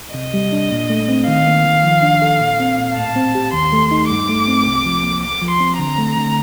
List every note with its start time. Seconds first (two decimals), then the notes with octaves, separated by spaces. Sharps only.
0.14 C3 D#5
0.34 G3
0.52 D4
0.71 A#2
0.90 A3
1.09 C4
1.27 D#3 F5
1.47 A#3
1.65 D#3
1.83 F3
2.02 D4
2.22 A4
2.41 A#2
2.60 C4
2.78 A#2
2.96 A2 A5
3.16 C4
3.35 G4
3.53 D#2 C6
3.72 A3
3.91 D#4
4.10 G2 D6
4.29 A3
4.48 C4
4.66 C2
4.85 F3
5.04 A#3
5.23 C2 D6
5.42 F3
5.51 C6
5.60 C4
5.79 D3 A#5
5.98 A3
6.17 D3